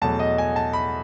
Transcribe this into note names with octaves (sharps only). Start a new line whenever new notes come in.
E2 B2 F#3 A3 A5
D#5
G#5
A5
B5